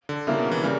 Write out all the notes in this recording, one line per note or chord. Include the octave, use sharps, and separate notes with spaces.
D3
C#3 G3 A#3 E4
B2
E3
C#3 G3 A#3